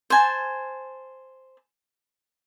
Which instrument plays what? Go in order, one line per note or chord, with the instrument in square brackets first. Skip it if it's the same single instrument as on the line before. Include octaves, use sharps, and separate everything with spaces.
[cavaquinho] C5 G#5 A5